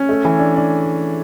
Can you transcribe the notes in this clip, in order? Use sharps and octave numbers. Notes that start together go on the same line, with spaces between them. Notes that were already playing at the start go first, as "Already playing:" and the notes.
Already playing: C#4
A3
E3
D4
D4